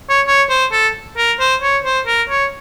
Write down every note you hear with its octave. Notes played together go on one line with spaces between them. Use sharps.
C#5
C#5
C5
A4
A#4
C5
C#5
C5
A#4
C#5